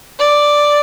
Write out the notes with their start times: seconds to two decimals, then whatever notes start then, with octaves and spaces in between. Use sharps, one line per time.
0.19 D5